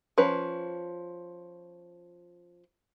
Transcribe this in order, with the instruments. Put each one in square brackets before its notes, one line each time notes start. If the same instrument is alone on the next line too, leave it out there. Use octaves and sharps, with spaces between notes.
[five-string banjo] F3 C#4 B4